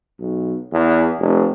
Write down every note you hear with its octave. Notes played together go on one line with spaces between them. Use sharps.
B1
E2
F1